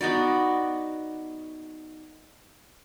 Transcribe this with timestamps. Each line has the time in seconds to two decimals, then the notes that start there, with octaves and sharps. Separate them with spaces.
0.01 B3 D#4 F#4 D5